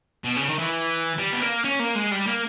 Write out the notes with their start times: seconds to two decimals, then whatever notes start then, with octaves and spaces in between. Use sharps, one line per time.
0.24 B2
0.36 C#3
0.48 D#3
0.59 E3
1.18 G3
1.33 B3
1.41 A#3
1.65 C#4
1.80 A#3
1.95 G#3
2.11 G3
2.27 A#3